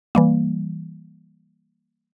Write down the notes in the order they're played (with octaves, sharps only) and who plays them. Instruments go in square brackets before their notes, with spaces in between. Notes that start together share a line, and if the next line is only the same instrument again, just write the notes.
[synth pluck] E3 G3 A#3